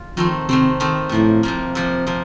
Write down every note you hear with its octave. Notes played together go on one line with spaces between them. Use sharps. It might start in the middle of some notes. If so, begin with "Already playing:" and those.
Already playing: F4
D#3 F3 A3 C4
C3 D#3 A3 C4
D#3 A3 C4
A2 C3 F3 A#3
C3 F3 A#3
C3 F3 A#3
C3 F3 A#3